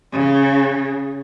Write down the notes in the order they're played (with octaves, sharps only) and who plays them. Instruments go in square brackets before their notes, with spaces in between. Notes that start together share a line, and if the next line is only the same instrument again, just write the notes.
[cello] C#3